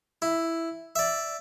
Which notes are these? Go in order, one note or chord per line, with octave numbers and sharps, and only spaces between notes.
E4
D5 E5